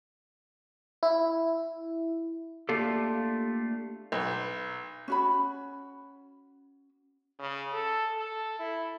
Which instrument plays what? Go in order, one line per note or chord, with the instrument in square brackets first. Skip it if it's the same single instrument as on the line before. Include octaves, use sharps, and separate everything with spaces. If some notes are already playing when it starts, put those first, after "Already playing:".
[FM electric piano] E4
[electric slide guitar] A3 A#3 D4 F4 G4 A4
[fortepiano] B1
[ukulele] C#4 F#4 B5
[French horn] C#3
A4
A4
E4